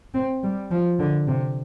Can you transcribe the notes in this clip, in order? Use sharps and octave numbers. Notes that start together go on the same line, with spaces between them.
C4
G3
F3
D3
C3